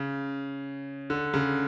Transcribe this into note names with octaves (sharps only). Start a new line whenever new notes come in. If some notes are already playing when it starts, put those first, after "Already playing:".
Already playing: C#3
D3
C#3